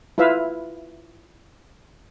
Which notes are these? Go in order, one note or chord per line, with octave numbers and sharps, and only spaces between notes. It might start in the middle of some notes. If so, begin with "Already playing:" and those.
E4 F4 B4 E5 F5